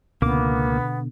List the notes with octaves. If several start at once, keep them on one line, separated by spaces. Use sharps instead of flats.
C#2 B2 D3 A#3 B3 D6